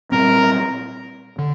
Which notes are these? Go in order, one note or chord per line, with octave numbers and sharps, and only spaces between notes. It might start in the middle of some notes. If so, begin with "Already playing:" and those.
A#2 G3 C4 A#4
D3